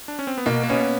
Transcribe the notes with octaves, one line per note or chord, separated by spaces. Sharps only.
D4
C#4
C4
B3
B2 A#3
A#3
B3 C#4